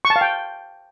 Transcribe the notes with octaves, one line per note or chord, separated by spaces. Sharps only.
C#6
A5
F5
G5